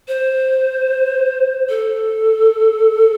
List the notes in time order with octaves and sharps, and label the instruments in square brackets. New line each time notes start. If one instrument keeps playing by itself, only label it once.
[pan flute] C5
A4